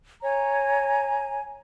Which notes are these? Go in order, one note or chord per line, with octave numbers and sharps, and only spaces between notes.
C#5 G#5 A#5